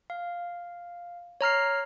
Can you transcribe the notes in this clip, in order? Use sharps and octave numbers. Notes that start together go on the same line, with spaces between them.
F5
C#5 A#5 F6 C7